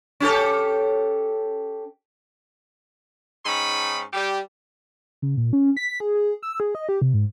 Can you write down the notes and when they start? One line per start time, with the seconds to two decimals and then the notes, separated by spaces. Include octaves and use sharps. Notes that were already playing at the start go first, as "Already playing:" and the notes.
0.20 C#4 G4 A4
3.46 G#2 C#4 D#4 G5 B5
4.13 G3 G4
5.22 C#3
5.37 A#2
5.53 C#4
5.77 B6
6.00 G#4
6.15 G#4
6.43 E6
6.60 G#4
6.75 D#5
6.89 G4
7.02 C3
7.14 G#2